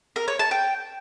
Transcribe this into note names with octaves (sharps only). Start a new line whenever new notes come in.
A#4
C#5
A5
G5